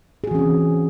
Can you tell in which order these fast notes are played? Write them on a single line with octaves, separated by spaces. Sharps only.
G#4 F#4 E3 C#4 C4